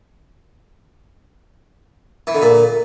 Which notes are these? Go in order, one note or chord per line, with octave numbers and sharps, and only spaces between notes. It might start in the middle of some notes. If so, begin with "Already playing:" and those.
E3
D3
A#2